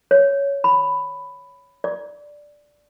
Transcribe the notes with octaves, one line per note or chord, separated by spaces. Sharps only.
C#5
B5
D5